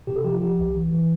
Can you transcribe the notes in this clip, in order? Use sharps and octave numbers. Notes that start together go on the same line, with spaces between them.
C3 G4
A4
F3 G4
F4
F3 G4
C2
E3
E3